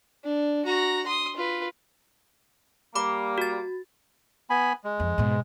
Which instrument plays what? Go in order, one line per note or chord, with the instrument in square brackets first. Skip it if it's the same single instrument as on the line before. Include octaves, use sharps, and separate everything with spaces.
[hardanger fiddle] D4
F#4 A#5
C6 D#6
F4 B4
[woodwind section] G3 A#3 [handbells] B5 D6
[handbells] F#4 A6
[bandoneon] B3 G#5 B5
G#3
[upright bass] F2
G#2 B2